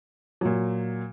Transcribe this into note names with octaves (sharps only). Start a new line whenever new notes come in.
A#2 F#3